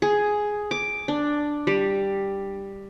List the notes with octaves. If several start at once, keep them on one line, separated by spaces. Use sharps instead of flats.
G#4
D6
D4
G3